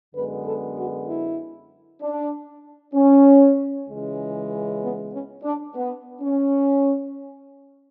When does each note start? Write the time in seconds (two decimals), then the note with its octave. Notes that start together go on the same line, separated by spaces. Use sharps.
0.14 F#2 D3 G#3 B3 B4
0.45 A4
0.77 F#4
1.08 E4
2.01 D4
2.94 C#4
3.89 C#2 C#3 E3 G#3
4.82 B3
5.13 C#4
5.43 D4
5.75 B3
6.22 C#4